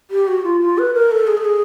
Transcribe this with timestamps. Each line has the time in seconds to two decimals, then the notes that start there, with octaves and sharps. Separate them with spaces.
0.11 G4
0.28 F#4
0.44 F4
0.61 F4
0.78 B4
0.94 A#4
1.11 A4
1.27 G#4
1.37 A4
1.45 G#4